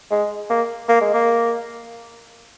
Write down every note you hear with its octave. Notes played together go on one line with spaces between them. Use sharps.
G#3
A#3
A#3
G#3
A#3